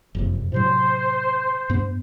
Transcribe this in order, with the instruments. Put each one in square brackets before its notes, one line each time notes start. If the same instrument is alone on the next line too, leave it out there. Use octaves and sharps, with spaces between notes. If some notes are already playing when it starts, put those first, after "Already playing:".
[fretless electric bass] F#1 F2 C3
[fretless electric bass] A2 C3 F#3 [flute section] C5
[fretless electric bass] G2 B3